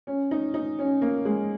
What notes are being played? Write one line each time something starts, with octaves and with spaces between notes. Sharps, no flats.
C#4
D#4
D#4
C#4
A#3
G#3